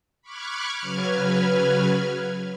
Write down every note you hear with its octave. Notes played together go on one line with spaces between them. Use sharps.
B5 C#6 D6 F6 F#6 G#6
C#3 F#3 B4 F6 G#6